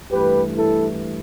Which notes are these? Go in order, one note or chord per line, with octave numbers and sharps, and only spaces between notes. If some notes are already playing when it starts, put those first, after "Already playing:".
G2 E3 A3 G4 B4
E4 A4